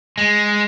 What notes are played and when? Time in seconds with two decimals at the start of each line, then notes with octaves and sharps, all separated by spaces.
0.18 G#3